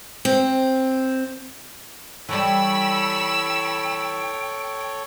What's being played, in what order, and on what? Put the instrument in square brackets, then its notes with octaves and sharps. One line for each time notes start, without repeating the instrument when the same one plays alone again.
[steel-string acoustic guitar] C4
[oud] E3 G3 [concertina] A4 C#5 [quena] G5 [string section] B5 C#6 E6